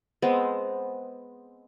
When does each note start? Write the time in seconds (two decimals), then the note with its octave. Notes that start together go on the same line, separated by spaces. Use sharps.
0.22 G#3 B3 C4